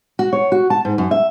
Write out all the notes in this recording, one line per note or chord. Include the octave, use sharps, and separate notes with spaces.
F#4
C#5
F#4
A5
G#2
F#2
E5